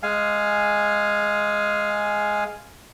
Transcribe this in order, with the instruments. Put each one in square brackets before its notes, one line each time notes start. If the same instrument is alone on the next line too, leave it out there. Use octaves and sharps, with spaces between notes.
[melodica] G#3 F5 G#5